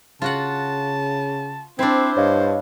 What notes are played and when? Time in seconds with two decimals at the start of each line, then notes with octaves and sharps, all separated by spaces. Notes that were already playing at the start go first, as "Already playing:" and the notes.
0.22 C#3 F4 F#4 F#5 A5
1.79 C4 D4 E4 C5
2.17 G2 C#5 D#5 F5